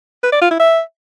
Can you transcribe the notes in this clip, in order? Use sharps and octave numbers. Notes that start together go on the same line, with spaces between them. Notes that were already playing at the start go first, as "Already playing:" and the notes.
B4
D5
F4
E4
E5